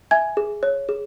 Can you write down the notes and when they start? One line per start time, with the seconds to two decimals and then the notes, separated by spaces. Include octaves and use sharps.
0.11 E5 G#5 G#6
0.37 G#4
0.63 C#5
0.89 G#4